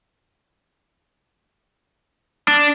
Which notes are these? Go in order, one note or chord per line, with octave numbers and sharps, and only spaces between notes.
D4